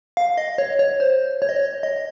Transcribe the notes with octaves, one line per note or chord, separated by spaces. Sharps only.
F5
D#5
C#5
C#5
C5
C#5
D#5
C#5
D#5